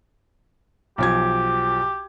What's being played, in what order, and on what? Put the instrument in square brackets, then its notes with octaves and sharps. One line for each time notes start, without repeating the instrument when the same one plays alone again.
[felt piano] B1 F3 G#6 [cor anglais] G4